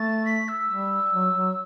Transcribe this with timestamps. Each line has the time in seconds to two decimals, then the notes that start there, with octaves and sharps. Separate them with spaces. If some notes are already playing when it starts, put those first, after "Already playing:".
Already playing: A3 A6
0.25 B6
0.48 E6
0.70 G3
1.14 F#3
1.36 F#3